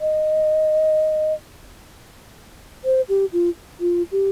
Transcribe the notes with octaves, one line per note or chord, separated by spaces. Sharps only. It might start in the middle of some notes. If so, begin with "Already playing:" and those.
D#5
C5
G4
F4
F4
G4